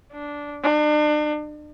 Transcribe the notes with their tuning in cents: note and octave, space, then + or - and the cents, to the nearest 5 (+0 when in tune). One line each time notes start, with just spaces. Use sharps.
D4 -10
D4 +35